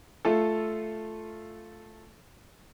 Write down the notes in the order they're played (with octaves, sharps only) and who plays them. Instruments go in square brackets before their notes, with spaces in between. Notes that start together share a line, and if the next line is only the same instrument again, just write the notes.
[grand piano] A3 F4 A4